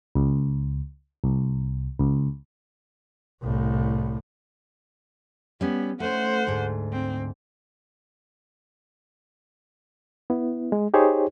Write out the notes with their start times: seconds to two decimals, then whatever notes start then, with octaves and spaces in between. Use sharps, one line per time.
0.15 C#2
1.24 C2
1.99 C#2
3.42 C2 A2
5.61 G3 B3 C#4
6.00 A3 C#4 C5 F#5
6.47 D2 G#2
6.93 C4
10.30 B3 E4
10.72 G#3
10.94 D#4 G4 G#4 C5 C#5